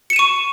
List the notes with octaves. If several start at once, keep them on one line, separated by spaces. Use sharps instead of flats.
C#6 C#7 D#7 E7